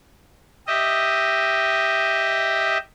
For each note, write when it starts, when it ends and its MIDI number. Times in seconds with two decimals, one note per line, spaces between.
0.67 2.78 67
0.67 2.78 75
0.67 2.78 76